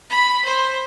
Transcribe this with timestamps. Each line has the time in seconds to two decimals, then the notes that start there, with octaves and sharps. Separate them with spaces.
0.10 B5
0.45 C5